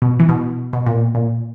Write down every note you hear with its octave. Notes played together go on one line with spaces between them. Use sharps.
B2
E3
B2
B2
A#2
A#2